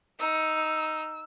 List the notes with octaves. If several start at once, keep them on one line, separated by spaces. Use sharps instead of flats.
D#4 E6